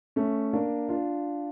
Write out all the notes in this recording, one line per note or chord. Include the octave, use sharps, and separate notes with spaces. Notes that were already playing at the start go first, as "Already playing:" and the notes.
A3 C#4
A#3 D4
D4 F4